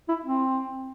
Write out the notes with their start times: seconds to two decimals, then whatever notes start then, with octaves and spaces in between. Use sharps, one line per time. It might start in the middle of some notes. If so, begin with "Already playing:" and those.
0.09 E4
0.25 C4